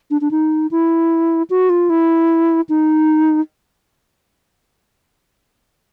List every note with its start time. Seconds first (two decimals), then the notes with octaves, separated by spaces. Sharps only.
0.11 D4
0.21 D4
0.31 D#4
0.71 E4
1.50 F#4
1.70 F4
1.90 E4
2.69 D#4